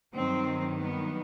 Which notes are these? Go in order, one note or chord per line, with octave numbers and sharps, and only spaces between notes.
G2 D#3 F#3 C4
B3